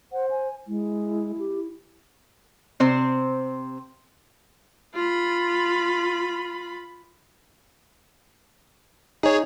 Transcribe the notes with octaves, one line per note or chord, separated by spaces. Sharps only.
C5 F#5
G#5
G#3 E4
G4
C3 C4 C5
F4 B5
D#4 G#4 C#5 G#5